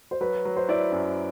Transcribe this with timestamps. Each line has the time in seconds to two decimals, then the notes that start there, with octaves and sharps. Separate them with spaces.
0.11 C5
0.21 F#3 B4
0.45 F#3
0.56 C5
0.69 E4 D5
0.92 F#2